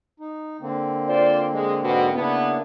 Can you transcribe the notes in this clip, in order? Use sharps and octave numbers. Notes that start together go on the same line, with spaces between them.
D#4
D3 A#3 C4
F4 C5 D5
G#3
G#2 B2
C#3 A#3 B3 D4 E4